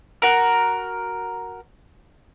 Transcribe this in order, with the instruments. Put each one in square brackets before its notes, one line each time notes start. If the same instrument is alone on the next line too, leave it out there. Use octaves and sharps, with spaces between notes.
[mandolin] F#4 A#4